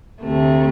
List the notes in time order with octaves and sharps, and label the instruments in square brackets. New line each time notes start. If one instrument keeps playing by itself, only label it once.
[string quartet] D2 C3 A3